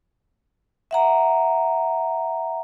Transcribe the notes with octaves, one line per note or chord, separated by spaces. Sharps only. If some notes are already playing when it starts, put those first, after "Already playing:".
E5 F#5 A#5